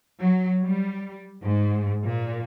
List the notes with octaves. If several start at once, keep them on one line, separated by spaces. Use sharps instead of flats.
F#3
G3
G#2
A#2